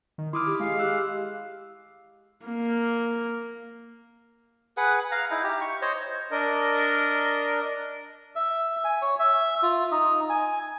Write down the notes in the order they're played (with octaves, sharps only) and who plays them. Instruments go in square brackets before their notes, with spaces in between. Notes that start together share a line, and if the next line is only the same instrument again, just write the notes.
[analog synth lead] D#3
[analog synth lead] E4 [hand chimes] C6 D#6 F6 [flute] D6
[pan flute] G4
[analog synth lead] G#3 [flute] F5
[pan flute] G4 [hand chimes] E6 F#6
[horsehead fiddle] A#3
[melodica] G#4 B4 F#5
F5 A#5
D#4 E4
G4
C#6
C5 C#5 D#5
[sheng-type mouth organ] D4 A#4 D#5
[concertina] E5
G#5
C#5
E5
F4
D#4
G#5